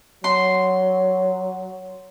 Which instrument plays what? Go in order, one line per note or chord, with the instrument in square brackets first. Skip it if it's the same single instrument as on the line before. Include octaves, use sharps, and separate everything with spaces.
[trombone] F#3 [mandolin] C6